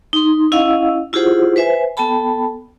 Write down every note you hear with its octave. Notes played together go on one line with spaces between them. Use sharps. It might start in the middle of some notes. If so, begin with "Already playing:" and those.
D#4 C6
C#4 E4 D#5 F5 F#5 E6
E4 F4 G4 G#4 C5 F#5
B4 C5 E5 G#5
B3 A4 G5 A5 B5